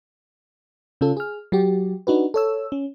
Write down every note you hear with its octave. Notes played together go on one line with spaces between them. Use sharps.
C#3 C#4 F4 A4
G#4 F6
F#3 F#4 G4
D4 D#4 F#4 B4
A4 C#5 E6
C#4